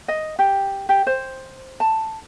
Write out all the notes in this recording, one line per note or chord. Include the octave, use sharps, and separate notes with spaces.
D#5
G4
G4
C5
A5